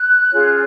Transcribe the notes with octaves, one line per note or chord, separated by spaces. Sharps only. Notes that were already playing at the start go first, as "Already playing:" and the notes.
Already playing: F#6
C#4 F4 G#4 C#5